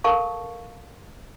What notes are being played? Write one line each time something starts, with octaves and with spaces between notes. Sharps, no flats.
A4 A#4 F5 A5 C#6